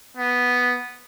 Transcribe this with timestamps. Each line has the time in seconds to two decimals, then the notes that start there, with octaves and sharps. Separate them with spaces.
0.17 B3